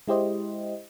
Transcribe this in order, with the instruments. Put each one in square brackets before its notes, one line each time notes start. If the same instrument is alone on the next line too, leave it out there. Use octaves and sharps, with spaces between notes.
[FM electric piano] G#3 E4 G4 C5 D#5